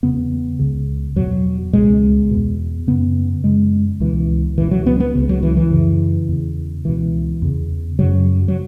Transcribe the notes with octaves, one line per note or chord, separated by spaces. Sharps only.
E2 C#3 B3
C#2 C#3
E2 B2 F#3
C#2 B2 G#3
E2 B2
F#2 C#3 B3
F#2 C#3 G#3
C#2 B2 E3
C#2 B2 E3
F#3
B3
B3
C#2 C#3
F#3
E3
E3
F#2 C#3
E2 C#3
C#2 B2 E3
E2 C#3
F#2 C#3 F#3
F#3